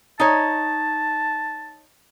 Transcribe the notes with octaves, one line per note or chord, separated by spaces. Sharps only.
D#4 C#5 A5